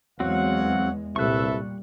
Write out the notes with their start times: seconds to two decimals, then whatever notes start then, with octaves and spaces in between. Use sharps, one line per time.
0.20 E2 F#3 G#3 C4 F#4 C#5 F5 F#5
1.16 C2 A#2 G3 A4 B4 E5 C#6 F#6